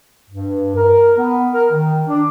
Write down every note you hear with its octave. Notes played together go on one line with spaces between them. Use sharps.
G2
A#4
B3
A#4
D#3
D4